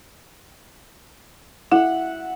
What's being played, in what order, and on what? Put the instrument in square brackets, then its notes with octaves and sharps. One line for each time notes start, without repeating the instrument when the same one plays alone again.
[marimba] E4 [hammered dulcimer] E5 F#5